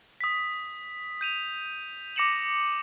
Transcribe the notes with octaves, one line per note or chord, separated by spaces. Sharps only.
D#6 B6
G6 D#7 F7
D6 A#6 C#7 E7 F#7